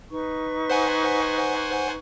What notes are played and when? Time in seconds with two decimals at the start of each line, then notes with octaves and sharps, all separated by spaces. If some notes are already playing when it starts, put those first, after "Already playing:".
0.10 D#4 B4 C#6
0.70 C5 F#5 G#5